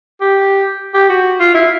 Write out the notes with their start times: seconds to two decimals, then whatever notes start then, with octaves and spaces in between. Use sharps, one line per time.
0.21 G4
0.94 G4
1.10 F#4
1.40 F4
1.54 E4